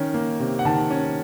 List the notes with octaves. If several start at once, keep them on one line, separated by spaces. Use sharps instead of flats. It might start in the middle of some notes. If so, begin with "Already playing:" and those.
Already playing: D#3 C#4
A#3
C3
F#5
D#3 A5
C#4